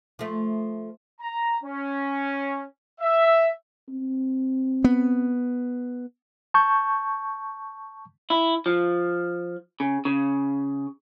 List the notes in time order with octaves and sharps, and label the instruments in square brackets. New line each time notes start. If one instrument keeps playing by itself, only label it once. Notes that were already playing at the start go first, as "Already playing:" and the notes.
[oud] F3 A3
[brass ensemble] A#5
C#4
E5
[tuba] C4
[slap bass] B3
[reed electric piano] A5 C#6 G6
[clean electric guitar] E4
F3
C#3
C#3